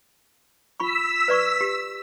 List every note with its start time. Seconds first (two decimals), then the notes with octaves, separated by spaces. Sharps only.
0.80 F4 B5 C#6 E6 B6
1.28 B4 D5 C#6
1.61 G4